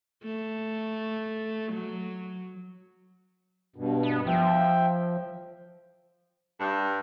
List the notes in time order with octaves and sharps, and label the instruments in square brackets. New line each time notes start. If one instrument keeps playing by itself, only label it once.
[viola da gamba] A3
F#3
[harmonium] G2 B2
[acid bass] B3
[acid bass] F3 [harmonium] E5 G5
[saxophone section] G2